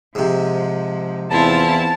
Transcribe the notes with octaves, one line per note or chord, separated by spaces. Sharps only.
G#2 C3 F3
E2 C4 E4 F4 A5